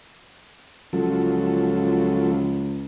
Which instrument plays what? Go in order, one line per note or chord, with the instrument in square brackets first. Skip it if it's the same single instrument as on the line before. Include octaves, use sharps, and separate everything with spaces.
[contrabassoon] C#2 [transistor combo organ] F3 F#3 A4